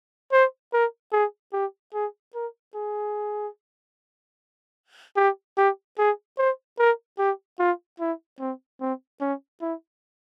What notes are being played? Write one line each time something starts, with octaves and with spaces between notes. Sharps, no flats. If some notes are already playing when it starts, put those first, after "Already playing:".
C5
A#4
G#4
G4
G#4
A#4
G#4
G4
G4
G#4
C5
A#4
G4
F4
E4
C4
C4
C#4
E4